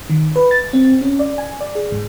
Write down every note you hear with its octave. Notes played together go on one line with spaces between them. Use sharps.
D#3
B4
A6
C4
C#4
D5
G#5
D5
G#4
G#2